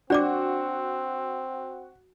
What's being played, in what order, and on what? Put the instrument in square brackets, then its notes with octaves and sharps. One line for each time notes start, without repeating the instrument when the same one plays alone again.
[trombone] C4 [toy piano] D4 D5 D6 [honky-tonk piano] F#4